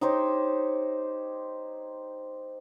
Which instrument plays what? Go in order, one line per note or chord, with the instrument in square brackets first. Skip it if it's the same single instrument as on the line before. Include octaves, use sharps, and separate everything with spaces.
[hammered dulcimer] D#4 G4 C5 C#5